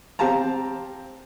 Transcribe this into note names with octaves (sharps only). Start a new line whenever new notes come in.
C4 G4 F5 A5 A#5